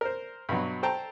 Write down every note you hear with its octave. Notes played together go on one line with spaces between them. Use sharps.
A#4 C5
G2 B2 F#3
A4 C5 G5 A5 A#5